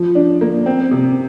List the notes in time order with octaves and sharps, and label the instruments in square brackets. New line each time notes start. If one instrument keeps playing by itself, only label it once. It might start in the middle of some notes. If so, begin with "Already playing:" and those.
Already playing: [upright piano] F3
D4
A#3
C4
C3